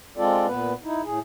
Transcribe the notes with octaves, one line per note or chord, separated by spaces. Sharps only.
G#3 C4 F4 A4 D5
A#2 B3 B4
D#4 E4
A2 G#4